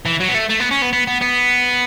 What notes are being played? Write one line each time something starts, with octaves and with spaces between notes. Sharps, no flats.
E3
F#3
B3
A3
A3
B3
C#4
B3
B3
B3
B3